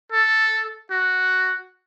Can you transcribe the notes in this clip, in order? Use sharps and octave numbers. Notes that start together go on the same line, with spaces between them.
A4
F#4